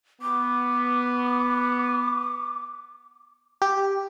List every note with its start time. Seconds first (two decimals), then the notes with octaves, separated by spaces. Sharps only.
0.22 B3 D6
3.62 G4